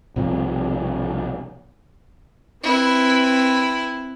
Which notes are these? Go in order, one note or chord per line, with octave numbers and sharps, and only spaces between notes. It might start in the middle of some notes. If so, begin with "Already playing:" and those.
B1 C3 F3 G3
C4 E4 B4